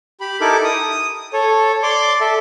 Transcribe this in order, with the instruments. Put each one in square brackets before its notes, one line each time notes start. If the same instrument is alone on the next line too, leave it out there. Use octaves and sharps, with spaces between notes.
[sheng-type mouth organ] G4 B5
D#4 E4 G4 A4 A#4 D6
D#6
A4 C#5
D5 C6 D6
A4 E5